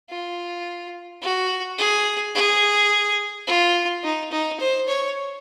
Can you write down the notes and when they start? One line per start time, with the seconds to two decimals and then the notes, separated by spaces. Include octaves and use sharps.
0.10 F4
1.22 F#4
1.78 G#4
2.35 G#4
3.47 F4
4.03 D#4
4.32 D#4
4.60 C5
4.88 C#5